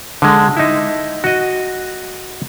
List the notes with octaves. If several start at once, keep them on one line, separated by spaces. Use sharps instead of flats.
D3 G#3
D#4 E4
F#4 D#5